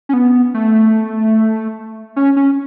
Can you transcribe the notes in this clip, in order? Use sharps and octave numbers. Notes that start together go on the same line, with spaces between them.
C#4
B3
A3
C#4
C#4